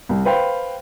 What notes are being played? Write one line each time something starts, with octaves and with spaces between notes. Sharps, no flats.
C2
B4 C5 F5 G5 B5